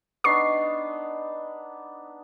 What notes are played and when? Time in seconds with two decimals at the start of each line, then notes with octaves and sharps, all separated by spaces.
0.24 B3 D4 D#4 C#6 C7